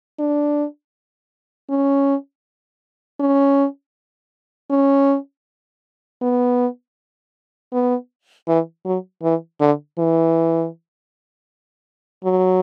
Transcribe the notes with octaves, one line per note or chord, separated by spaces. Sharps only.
D4
C#4
C#4
C#4
B3
B3
E3
F#3
E3
D3
E3
F#3